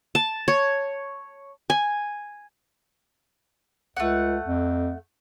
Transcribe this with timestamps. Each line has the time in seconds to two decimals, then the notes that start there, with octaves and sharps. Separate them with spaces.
0.15 A5
0.48 C#5
1.70 G#5
3.96 C#2 A3 C4 F#5
4.46 F2